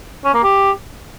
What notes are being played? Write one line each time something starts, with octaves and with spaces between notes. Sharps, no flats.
C#4
A#3
G4